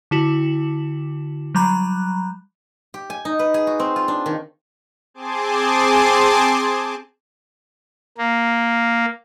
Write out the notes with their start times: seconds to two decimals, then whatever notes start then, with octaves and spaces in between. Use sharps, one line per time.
0.11 D3 E4 F#4
1.55 F#3 G3 A#5 B5 F#6
2.94 G4
3.10 G#5
3.25 D#4
3.39 B4
3.54 G#4
3.67 F#4
3.80 C4
3.96 F4
4.08 D4
4.26 D#3
5.14 C4 G#4 G#5 A5 C6 D6
8.17 A#3